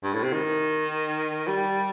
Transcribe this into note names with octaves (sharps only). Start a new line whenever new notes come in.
G2
A2
C3
D#3
G3